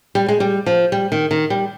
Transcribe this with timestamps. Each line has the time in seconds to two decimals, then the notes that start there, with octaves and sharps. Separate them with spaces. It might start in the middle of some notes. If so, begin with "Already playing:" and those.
0.15 G3
0.29 G#3
0.40 G3
0.66 F3
0.92 G3
1.12 D#3
1.31 D#3
1.50 G3